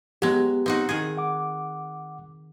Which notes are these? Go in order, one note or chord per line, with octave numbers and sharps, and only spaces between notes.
F#3 G#3 B3 G4
C4 D#4 F#4
D#3 G#4
F#5 D6